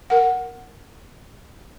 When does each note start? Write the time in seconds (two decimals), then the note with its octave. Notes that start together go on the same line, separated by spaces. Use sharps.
0.10 A#4 F#5